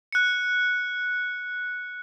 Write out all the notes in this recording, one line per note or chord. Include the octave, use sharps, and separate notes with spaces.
F#6 C#7